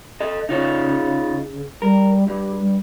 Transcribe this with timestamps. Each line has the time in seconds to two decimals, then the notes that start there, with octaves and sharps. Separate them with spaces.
0.20 A4 D#5
0.49 C#3 D#4 F4 C#5
1.82 G3 A#4
2.28 G2 G4
2.61 G3